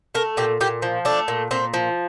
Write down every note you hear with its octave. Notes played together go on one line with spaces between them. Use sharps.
A3 A#4
A#2 G4
A#2 G4
F3
A3 D4
A#2
A#2 C4
F3